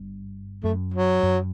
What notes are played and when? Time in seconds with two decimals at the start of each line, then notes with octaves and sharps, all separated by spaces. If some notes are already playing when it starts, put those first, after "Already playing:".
Already playing: G1 G2
0.63 F#2 A3
0.94 F#3
1.23 F#2